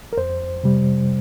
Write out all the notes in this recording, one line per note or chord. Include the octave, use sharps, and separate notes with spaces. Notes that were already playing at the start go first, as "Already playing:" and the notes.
A#4
F2 C5
C3 G3